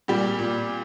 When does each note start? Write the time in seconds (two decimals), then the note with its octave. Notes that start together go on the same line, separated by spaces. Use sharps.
0.08 A#2 G3 G4
0.39 A#2